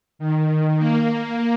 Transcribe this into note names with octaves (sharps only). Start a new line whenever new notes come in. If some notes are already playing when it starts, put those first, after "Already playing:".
D#3
A#3